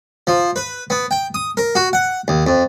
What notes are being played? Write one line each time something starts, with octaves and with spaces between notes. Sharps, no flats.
F3
B4
B3
G5
D#6
A#4
F#4
F#5
D#2
F2